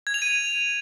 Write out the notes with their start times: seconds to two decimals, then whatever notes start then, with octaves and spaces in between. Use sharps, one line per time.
0.07 G#6
0.14 F7
0.22 D#7